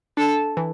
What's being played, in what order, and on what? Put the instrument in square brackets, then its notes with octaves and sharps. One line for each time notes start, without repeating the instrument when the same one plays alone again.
[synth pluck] D4 [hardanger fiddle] A4
[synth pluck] E3